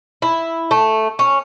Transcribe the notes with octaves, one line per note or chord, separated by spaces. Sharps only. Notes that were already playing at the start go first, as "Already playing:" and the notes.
E4
A3
C#4